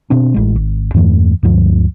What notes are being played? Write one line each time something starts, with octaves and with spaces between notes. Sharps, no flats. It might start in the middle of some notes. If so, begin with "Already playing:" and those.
B2 C4 D4
A1 G#3
G#1
E2 G2 E3 A3
D2 G2 F3 G#3